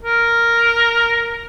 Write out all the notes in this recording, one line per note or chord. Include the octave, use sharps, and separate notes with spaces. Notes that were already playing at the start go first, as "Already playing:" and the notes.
A#4